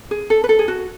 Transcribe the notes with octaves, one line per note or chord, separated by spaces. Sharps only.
G#4
A4
B4
A4
G#4
F#4